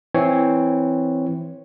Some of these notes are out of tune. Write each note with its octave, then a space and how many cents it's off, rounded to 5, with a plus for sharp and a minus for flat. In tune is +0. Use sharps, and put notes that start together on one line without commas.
E3 +0 C4 +0 C#5 +0